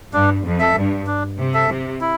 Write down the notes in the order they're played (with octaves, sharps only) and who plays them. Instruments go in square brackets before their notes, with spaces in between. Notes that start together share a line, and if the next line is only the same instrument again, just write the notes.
[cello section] G2 [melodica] D4
[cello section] F2
[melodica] A4 E5
[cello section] G2
[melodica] D4
[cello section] C3
[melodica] A4 E5
[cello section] C3
[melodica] E4